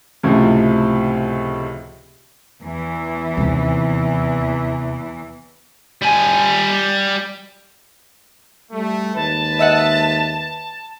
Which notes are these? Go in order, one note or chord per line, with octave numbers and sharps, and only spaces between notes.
C#2 A2 C3 F3
E2 E3
D#2 C3
G3 G#5
G3 A3
D#2 G#3 B4 A5
D#5 E5 F#5